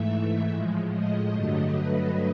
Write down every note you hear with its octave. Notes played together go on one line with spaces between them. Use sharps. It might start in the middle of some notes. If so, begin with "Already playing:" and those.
Already playing: G#2 E3 A3 E5
A2 F3 G#3
D#5
G2 D3 F#3 A3
B4